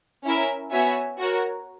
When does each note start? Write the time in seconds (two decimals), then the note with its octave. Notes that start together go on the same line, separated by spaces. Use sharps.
0.24 C#4 E4 A#4 E5
0.71 B3 F#4 C#5 E5 G#5
1.19 F#4 A#4 C#5